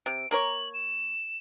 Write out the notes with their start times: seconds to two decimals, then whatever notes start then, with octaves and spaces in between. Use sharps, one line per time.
0.06 C3 D7
0.31 A#3 A#4 C#5 F#7
0.74 E7